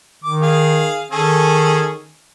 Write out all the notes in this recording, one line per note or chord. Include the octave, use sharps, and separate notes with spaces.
D#3 D6
G#4 F5
D#3 C#4 G#4 A4